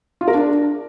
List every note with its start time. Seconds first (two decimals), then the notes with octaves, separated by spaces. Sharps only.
0.21 F4
0.28 A#4
0.34 D4